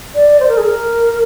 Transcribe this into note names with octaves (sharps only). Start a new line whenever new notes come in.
D5
C5
A#4
G#4
A#4